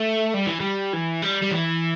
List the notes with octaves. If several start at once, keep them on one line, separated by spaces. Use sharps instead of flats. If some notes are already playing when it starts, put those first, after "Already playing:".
Already playing: A3
G3
E3
G3
E3
G3
G3
E3